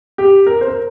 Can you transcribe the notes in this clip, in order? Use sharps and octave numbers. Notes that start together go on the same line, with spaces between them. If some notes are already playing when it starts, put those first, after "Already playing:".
G4
A#4
C5
A#4